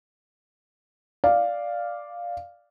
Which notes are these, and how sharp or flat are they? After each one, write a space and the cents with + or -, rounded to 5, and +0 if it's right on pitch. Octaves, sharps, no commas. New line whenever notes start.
D5 +0 F5 +0